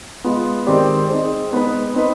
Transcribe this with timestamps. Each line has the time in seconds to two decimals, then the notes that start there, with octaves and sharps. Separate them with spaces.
0.24 G#3 B3 F4
0.67 D#3 G#3 C4 G4 D5
1.09 C4 D#4 G#4 C5
1.51 G#3 B3 D#4 B4
1.94 C4 D#4 B4